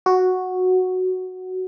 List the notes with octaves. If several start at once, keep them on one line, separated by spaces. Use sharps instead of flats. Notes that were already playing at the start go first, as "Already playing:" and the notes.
F#4